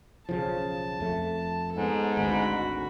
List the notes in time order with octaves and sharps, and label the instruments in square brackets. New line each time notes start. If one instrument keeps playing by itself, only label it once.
[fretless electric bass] B1 C#3 F3 [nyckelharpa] A5
[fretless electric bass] F2 A3
[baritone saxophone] G#2 [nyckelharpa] B3 A4
[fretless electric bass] G#1 D2 [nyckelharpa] F#4 B5